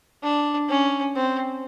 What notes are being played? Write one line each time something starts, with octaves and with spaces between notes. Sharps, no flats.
D4
C#4
C4